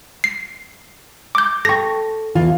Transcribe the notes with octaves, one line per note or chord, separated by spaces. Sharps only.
C7
D6 G6
A4 G5 C#6 A#6
E2 E3 F4